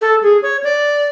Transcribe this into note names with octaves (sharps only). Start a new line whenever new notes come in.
A4
G#4
C#5
D5